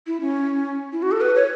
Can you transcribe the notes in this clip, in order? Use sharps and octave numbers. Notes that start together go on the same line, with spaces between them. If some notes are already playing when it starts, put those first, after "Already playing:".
E4
C#4
E4
F#4
A4
B4
C#5